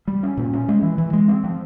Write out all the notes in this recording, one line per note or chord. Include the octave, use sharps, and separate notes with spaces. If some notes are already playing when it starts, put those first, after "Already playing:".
G3
C#4
A#2
C#4
G#3
E3
E3
G#3
C4
F3